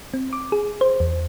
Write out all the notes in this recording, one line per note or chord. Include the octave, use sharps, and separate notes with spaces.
C4
D6
G#4
C5
E2